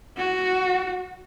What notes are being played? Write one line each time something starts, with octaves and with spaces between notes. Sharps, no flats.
F#4